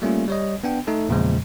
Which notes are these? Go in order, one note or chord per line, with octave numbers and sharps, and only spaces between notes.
G3 A3 A#3 C#4 F4
G3 C#5 D#5
B3 D4 G5
A3 D#4 A4
E2 A#2 C#3 F3 G#3